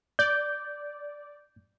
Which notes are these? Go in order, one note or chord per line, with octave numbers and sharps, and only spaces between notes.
D5 G6